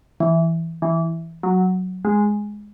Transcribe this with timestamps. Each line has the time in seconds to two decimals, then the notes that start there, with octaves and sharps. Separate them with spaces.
0.20 E3
0.82 E3
1.43 F#3
2.05 G#3